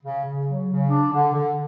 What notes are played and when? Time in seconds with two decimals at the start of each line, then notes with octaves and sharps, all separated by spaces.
0.03 C#3
0.25 C#3
0.47 F#3
0.68 C#3
0.90 D4
1.12 D3
1.33 D3